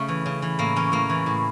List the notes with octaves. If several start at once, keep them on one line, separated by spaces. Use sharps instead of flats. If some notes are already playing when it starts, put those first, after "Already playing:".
Already playing: C#3 A3
E3
C#3
E3
A2 A#3
E3 C#4
A2 A#3
E3
A2